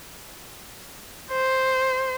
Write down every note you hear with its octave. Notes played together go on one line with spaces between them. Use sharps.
C5